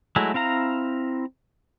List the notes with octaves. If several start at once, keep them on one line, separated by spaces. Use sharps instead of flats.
F#3 G#3 A3 E4
C4 E4 F5 A#5